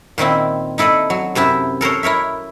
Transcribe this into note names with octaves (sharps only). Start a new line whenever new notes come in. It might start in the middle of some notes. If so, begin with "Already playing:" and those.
A#2 D#3 C4 E4
D#4 E4 A4 D5 D#5
F#3
F#2 C3 E4 A5
A4 A#4 C5 C#5
E4 A#4 C#5 E5